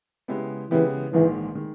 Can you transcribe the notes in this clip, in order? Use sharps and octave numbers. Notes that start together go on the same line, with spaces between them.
C#3 G#3 B3 E4 G4
C#3 E3 G#3 B3 E4 G4
A#1 G#2 D#3 E3 G#3
D#3 G#3